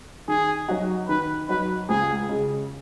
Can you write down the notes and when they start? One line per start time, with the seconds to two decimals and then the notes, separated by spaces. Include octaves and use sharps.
0.28 D#3 G#4
0.69 F#3 D#4 F#4
1.08 D#3 B4
1.49 F#3 D#4 F#4 B4
1.89 C#2 G#4
2.29 C#3 G#3